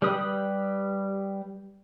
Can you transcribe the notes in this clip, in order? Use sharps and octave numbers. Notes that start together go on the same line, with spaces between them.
G3 G4 B4 D#6